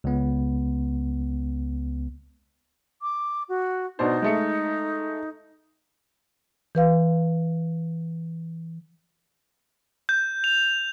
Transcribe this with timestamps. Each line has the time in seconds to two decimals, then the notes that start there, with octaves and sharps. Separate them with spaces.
0.04 C#2 B3
3.02 D6
3.49 F#4
3.99 B2 D4 D#4 C5
4.22 G#3 A3 C#7
6.75 E3 B4 F5
10.09 G6
10.44 F7